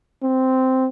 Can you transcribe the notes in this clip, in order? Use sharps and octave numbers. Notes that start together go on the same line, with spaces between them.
C4